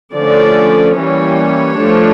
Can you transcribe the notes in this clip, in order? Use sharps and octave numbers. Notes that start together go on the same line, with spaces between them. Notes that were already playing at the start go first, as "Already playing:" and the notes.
D3 F3 A3 C#4 D5
E3 G3 A#3 C#4 C#5
F3 A3 D4